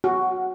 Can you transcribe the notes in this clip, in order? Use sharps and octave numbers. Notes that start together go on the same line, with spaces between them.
F#4